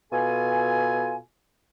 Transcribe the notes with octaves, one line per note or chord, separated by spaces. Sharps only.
B2 F4 A4 G#5